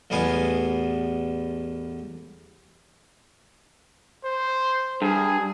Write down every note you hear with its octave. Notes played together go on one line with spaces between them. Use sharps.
A1 E2 B3 F5 G#5 D#6
C5
G2 G#4